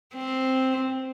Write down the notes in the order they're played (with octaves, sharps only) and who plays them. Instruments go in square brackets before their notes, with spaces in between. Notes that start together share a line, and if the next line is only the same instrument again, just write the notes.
[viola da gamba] C4